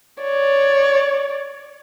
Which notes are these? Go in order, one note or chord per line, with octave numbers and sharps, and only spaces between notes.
C#5 D5